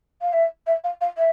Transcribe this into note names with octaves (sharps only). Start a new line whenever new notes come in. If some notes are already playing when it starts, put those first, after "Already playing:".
F5
E5
E5
F5
F5
E5